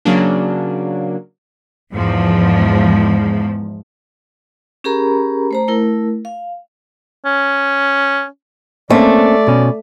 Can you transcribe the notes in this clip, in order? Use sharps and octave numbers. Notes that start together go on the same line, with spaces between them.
C#3 F#3 A#3 D4
E2 G#2 F3
C#4 G4 G#4 A#4 A#5 B5
A3 C5 A#5
A3 E4 A#4
F5
C#4
A3 A#3 C4 C#4 D5
B2 C#4